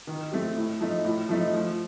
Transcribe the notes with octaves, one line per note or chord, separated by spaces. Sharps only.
D#3
A3 C4 G4
A2
F3 A3 D#4
A2
F3 A3 D#4
F3